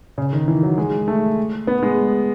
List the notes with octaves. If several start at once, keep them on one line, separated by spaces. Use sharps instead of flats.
C#3
D#3
E3
F#3
G#3
A3
B3
G#3